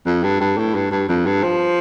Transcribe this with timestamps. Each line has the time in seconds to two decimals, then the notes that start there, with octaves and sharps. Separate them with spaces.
0.06 F2
0.23 G2
0.40 G2
0.57 A2
0.75 G2
0.91 G2
1.09 F2
1.26 G2
1.43 F3